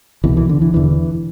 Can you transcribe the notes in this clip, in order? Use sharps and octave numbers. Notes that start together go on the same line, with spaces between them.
C2 B2 E3
E3
D3
E3
E1 E2 D3 E3